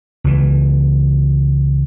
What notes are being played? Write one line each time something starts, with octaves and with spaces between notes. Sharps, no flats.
C#2 E3